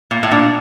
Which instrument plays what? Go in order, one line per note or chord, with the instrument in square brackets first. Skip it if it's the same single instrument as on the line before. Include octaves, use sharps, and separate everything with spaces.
[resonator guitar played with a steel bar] A#2
A2
[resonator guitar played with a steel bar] A#2 [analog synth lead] D4